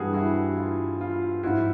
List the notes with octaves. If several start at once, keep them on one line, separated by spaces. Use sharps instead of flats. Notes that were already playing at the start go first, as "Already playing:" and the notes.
Already playing: G2 E3 G3 F#4 G#4
E4 F#4
F4
F4
G#2 F3 E4 F#4